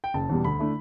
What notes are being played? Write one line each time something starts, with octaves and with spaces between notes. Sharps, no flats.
G5
F#1 A5
E2 B2 G3
D2 B5
D3 A3 E4